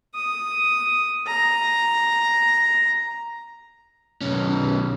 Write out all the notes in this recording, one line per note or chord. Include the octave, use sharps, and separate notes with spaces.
D#6
A#5
B1 C#4